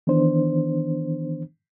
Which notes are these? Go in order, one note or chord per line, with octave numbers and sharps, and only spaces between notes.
D#3 E3 B3 D4 C5